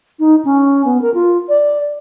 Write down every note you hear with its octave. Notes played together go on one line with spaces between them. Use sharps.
D#4
C#4
B3
A#4
F4
D5